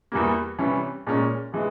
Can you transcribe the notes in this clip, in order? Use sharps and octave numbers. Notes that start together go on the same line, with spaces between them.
E2 E3 G3 A#3
C3 E3 G3 C#4
A#2 G#3 C#4
C3 E3 G#3